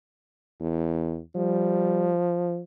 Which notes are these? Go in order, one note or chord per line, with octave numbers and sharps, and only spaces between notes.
E2
F3 G3